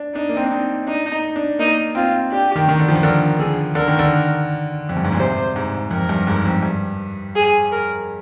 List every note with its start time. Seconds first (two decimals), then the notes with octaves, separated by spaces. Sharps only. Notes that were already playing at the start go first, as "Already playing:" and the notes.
Already playing: D4
0.15 D4 D#4
0.29 A#3
0.37 C4
0.44 D4
0.51 D#4
0.87 D4 D#4
1.12 D#4
1.36 D4
1.59 A#3 D#4
1.95 C4 F4
2.32 D4 G4
2.55 D#3
2.69 D#3
2.79 D3
2.88 F3
2.95 D#3
3.03 D3 A#4
3.39 D3 G#4
3.75 D3 A#4
3.88 D#3
3.99 D3
4.89 F2
4.97 G2
5.04 G#2
5.12 A#2
5.19 C3 C5
5.56 G#2
5.91 F2 A#4
6.09 G2
6.27 G#2
6.45 F2
6.63 G2
7.35 G#4
7.72 A#4